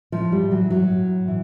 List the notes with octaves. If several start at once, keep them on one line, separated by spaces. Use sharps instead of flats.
A2 F3
G3
E3 F#3
F#3
A2
E3